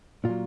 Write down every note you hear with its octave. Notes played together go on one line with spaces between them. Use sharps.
A#2 F#3 F4